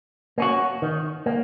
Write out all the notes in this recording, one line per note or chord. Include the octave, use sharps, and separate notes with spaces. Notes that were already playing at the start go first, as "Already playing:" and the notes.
A#3 C#4 F#4
D#3
A#3